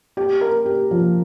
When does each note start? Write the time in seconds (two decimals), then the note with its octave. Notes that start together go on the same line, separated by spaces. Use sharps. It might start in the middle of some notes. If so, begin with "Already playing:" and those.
0.17 G4
0.41 A#4
0.66 G4
0.91 F3